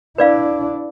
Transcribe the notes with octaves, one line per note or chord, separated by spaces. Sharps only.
D4 E4 B4 D5 F5